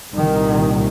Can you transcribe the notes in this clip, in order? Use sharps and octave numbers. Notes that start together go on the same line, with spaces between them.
C2 A#2 D#3